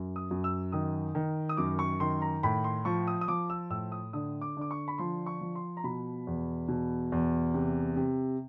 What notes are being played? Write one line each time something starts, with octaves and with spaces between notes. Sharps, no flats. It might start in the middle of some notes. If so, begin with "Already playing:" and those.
Already playing: F#2
D#6
F#2
E6
D#3 D#6
D#3
D#6
F#2 D6
C#6
D#3 C6
A#5
A2 B5
C6
F3 C#6
D#6
D#6
F3 D6
E6
A2 E6
D#6
D3 D#6
D6
D3 D6
C#6
B5
F3 C6
C#6
F3
C6
A#5
B2 B5
E2
B2
E2
C3
C3